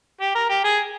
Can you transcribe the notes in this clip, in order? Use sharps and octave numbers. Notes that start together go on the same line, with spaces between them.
G4
A#4
G4
G#4